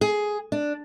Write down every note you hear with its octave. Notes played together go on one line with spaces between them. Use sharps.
G#4
D4